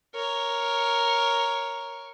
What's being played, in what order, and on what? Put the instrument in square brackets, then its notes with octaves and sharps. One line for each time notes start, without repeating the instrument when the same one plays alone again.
[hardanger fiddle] A#4 C#5